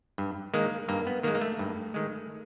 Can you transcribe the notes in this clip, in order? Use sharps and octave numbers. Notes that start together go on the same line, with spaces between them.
G2
D#3 G#3 A#3
G2 A#3
B3
D#3 G#3 A#3
A#3
A3
G2
D#3 G#3